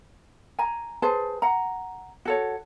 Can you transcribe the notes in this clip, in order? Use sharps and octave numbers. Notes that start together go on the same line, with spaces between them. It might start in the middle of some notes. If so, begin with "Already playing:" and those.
G#5 A#5
G#4 B4 C5 A5
F#5 A#5
F#4 A4 C#5